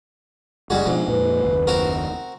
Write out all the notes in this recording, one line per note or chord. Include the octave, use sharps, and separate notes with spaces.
F#1 G3 G#3 F#4
G#2 B2 F3
F2 A#2 B4
F#1 D#2
C4 F#4 A#4